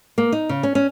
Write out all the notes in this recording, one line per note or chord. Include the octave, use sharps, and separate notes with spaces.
A#3
D#4
C#3
C#4
C#4